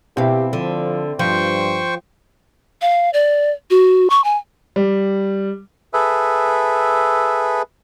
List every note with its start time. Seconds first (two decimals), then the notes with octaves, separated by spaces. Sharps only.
0.17 B2 C4 E4 G4 E5 F5
0.53 D3 F3
1.19 G2 F3 C5 G5 C#6
2.82 F5
3.13 D5
3.71 F#4
4.10 C#6
4.24 G#5
4.76 G3
5.93 G#4 A4 B4 E5